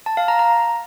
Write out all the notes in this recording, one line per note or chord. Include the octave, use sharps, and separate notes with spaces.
A5
F5
A#5
A#5